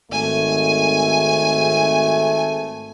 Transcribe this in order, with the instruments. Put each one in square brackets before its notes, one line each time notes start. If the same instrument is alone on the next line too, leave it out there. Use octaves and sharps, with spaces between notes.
[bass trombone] G#1 [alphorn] A3 [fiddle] G#5